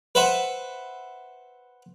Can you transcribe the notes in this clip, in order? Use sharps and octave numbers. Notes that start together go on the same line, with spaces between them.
B4 C5 E5 F#5